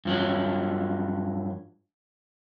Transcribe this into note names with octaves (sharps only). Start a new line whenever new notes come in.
G2 F3 F#3